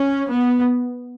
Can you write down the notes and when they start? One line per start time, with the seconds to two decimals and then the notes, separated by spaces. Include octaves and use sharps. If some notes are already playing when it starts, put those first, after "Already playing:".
Already playing: C#4
0.29 B3